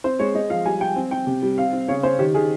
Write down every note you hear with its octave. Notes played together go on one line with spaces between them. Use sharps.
C4 C5
G#3 C#5
G#3 D#5
F3 F5
G3 G#5
G3 G5
C4
C4 G5
C3
G3
C4 F5
C4
C#3 C#5
C#4 C5
D#3 G4
D#3 G#4